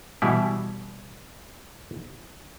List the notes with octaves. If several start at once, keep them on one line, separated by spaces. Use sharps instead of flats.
B2 E3 G3 E4